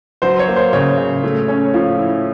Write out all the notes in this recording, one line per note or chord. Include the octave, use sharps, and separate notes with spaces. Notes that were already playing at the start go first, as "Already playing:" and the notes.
F#3 C5
C#5
A#3
C5
C#3 C#5
C#3
A3
C#4
F3
E4